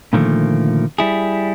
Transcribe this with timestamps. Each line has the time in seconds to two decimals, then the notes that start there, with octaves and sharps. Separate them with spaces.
0.13 A#2 D3 D#3 F3 A3 A#3
0.98 G3 E4 G#4